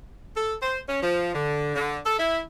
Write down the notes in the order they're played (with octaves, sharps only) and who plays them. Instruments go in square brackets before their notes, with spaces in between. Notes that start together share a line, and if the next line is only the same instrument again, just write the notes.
[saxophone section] A4
C5
C#4
F3
D3
D3
A4
E4